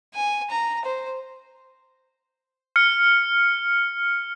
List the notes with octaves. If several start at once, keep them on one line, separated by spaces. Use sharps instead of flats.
G#5
A#5
C5
F6 C#7